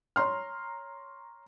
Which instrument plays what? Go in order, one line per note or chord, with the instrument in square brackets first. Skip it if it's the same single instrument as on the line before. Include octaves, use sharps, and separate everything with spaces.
[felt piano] C#5 A#5 C6 F6